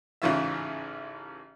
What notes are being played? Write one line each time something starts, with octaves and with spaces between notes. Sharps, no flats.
A1 G#2 C#3 E3 F4 E5